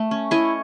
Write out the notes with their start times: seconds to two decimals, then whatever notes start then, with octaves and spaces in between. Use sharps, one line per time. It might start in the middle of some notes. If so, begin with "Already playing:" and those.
Already playing: A3
0.11 C#4
0.31 E4 C#5 D#5